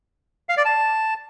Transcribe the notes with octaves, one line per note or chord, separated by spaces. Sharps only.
F5
D5
A5